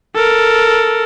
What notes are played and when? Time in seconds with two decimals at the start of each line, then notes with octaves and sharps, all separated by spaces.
0.15 A4 A#4